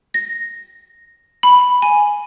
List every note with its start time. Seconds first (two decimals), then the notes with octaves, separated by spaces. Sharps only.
0.14 A#6
1.43 B5
1.82 G#5